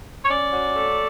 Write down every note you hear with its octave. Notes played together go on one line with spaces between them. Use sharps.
C#5
C#4 D5
F#3
A3